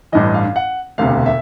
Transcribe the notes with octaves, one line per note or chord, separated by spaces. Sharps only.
A1 G2 E3 D#5
F5
F#5
E1 D2 C3 F5
E5